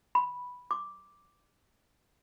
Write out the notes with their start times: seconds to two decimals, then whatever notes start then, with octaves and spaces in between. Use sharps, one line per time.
0.15 B5
0.71 D6